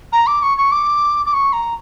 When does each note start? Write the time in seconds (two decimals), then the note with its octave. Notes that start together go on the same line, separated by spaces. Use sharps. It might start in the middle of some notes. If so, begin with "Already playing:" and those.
0.13 A#5
0.27 D6
0.43 C#6
0.58 C#6
0.72 D6
1.26 D6
1.34 C#6
1.53 A#5